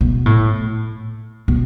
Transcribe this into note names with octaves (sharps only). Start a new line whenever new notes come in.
B2
A2
B2